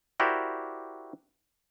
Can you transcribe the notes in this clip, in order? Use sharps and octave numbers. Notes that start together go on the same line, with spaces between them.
E4 F#4 G4 A#4 C5 D5